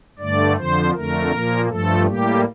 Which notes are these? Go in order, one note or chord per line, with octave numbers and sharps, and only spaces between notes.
G2 D3 A3 D5
F2 D3 F3 C5
F2 D3 A3 A#4
A#2 F3 A#3
G2 F3 A3 A4
A2 G3 A#3 G4